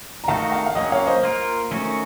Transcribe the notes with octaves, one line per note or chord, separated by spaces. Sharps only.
A#5
D#3 A3 D#4 F#4 F5 A5
F5 A5
F5
F#3 A#3 C#4 D#5 F#5
C#5 F5
C5 D#5
A#3 F4 A#4
D#3 A3 C#4 F#4